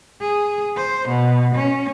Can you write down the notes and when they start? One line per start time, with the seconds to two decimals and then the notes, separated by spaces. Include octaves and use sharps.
0.22 G#4
0.77 C5
1.08 B2
1.55 C#4